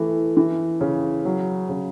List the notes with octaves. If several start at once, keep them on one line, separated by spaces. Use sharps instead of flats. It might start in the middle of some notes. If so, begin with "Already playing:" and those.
Already playing: E3 A3
E3
C#3
F#3
C#3